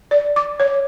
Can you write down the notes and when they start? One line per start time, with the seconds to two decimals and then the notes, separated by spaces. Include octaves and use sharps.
0.11 D5
0.36 D6
0.60 C#5